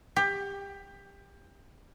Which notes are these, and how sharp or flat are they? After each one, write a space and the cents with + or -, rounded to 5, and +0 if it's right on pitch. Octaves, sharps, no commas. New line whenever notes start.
G4 +20